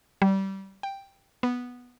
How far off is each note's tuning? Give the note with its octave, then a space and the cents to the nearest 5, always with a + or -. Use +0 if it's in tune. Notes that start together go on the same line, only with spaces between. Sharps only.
G3 -20
G5 +5
B3 -5